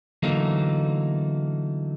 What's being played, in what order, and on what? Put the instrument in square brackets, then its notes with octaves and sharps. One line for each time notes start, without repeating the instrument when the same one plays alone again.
[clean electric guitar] D3 E3 F#3 A3 A#3 D#4